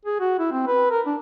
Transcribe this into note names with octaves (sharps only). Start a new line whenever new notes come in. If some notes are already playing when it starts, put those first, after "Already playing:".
G#4
F#4
E4
C4
B4
A#4
D4